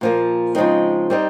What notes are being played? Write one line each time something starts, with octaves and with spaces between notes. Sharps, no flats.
A#2 F3 A#3
C#3 F3 G#3 C4 D#4
G3 C4 D#4